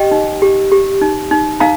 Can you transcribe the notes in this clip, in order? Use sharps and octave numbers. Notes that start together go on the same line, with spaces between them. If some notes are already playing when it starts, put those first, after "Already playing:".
Already playing: G4 D#5 G5
D#4
G4
G4
D#4
D#4
D#4 F5 A#5